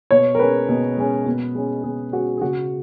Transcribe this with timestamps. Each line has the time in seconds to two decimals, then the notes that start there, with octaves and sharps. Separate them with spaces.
0.11 B2 C#5
0.35 A#4
0.39 G#3 C#4 B4
0.69 B2
0.98 G#3 C#4
1.26 B2
1.55 G#3 C#4
1.83 B2 G#4
2.12 G#3 C#4 F#4
2.37 G#4
2.41 C#3 F#4